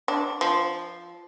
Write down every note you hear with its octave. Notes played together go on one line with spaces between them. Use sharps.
D4
F3